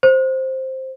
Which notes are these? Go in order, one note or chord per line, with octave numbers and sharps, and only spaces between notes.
C5